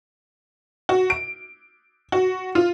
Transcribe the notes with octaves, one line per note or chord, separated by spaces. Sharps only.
F#4
D7
F#4
F4